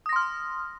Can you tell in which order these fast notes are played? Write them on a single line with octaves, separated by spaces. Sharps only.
D#6 A#6 C6 F6